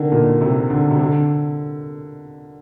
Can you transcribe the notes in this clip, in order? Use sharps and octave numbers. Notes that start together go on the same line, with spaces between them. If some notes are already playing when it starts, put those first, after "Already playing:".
Already playing: D3 D#3
A#2
C3
D3
C3
D3